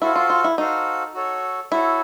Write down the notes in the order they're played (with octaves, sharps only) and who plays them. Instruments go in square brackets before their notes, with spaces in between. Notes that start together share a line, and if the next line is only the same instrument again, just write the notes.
[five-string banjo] E4 [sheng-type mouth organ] F#4 A4 C5 F5
[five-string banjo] F4
F4
E4
[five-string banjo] D#4 [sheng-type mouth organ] F#4 A4 C5 F5
[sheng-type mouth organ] F#4 A4 C#5
[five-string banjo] E4 [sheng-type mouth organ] F#4 A4 C#5